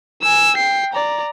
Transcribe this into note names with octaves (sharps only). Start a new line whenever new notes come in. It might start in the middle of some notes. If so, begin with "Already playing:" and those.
G#5 E6
G5 C7
D5 A#5